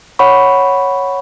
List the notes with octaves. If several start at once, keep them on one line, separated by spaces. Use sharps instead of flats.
C#5 F#5 B5 C#6